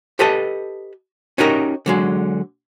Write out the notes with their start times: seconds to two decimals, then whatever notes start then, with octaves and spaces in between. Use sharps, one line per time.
0.19 G4 A4 B4 D#5 A5
1.38 C#4 D#4 F#4 G4 A#4 D#5
1.86 D3 F#3 G#3